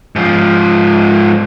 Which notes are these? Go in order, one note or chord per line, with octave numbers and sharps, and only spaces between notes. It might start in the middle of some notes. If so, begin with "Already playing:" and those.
G#2 F3